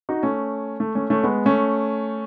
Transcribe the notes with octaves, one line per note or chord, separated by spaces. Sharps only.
D#4 F#4
A3 C#4
A3
A3 C#4
A3 C#4
G#3 B3
A3 C#4